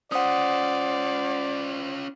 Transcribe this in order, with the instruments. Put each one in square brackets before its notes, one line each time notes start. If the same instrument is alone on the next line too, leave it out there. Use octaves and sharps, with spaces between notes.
[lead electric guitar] C#4 F4 [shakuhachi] C5 [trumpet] D5 [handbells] F#5 D#6